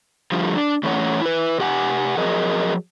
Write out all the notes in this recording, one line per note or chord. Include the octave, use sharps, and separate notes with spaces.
D3 F3 G3 A3 F4
D4
A2 E3 A3 C#4 C#5 F#5
E4 B4
C3 G4 F#5 G#5
F3 F#3 G#4 A#4 D#5